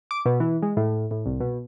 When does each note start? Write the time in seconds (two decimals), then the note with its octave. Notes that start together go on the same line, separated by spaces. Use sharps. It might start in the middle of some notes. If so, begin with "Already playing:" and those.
0.11 D6
0.26 B2
0.40 E3
0.62 G#3
0.77 A2
1.11 A2
1.26 C2
1.40 B2